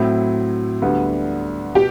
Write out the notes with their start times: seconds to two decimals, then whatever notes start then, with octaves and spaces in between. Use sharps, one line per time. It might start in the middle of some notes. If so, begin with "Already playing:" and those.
Already playing: A2 F#3 C4 E4
0.82 D2 D3 G3 B3
1.75 B2 G4